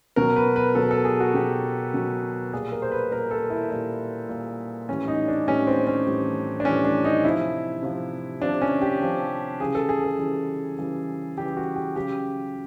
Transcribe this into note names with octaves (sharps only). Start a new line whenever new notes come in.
B2 F#3 A#4
B4
B4
B2 F#3 A4
A4
G#4
F#4
B2 F#3 G4
B2 F#3
A#2 G3 G#4
A#4
C5
B4
A#2 G3 A#4
A4
E4
A#2 G3 E4
A#2 G3
A2 E3 G3 C#4
D#4
D4
A2 E3 G3 C#4
C4
C#4
A2 E3 G3
D4
A2 E3 G3 C#4
D4
D#4
C3 F3 E4
C3 F3
C3 F3 D4
C#4
G4
C3 F3
C#3 E3 G3 G#4
A4
G#4
A4
C#3 E3 G3
C#3 E3 G3
C#3 E3 G3 G4
F#4
G4
C#3 F#3 G4